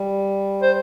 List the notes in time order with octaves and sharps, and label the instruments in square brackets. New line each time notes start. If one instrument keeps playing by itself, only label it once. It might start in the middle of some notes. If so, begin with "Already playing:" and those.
Already playing: [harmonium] G3
[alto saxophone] C5